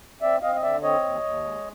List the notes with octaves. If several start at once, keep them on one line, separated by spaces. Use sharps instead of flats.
C4 D5 E5
C4 D#5 F5
D#5
D3 D5 E5
C4 C#5 D#5
D#2
D#2
G#3